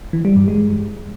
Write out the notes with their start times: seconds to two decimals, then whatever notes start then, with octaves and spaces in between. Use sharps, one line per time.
0.13 E3
0.25 G3
0.36 G2
0.48 G#3